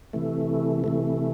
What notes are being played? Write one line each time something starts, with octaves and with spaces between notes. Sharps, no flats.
C3 E3 A3
C3 E3 A3